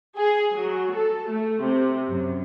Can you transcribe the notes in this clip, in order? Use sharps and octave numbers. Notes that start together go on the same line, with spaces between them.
G#4
F#3
A4
A3
C3
F#2